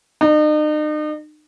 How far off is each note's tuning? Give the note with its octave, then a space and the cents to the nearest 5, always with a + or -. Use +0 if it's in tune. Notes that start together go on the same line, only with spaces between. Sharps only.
D#4 -40